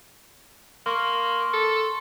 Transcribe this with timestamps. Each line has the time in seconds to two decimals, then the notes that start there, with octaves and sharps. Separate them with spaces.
0.86 A#3 C6 C#6
1.53 A4